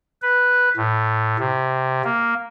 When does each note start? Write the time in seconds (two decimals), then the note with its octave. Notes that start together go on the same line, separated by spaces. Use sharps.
0.22 B4
0.77 A2
1.39 C3
2.04 A#3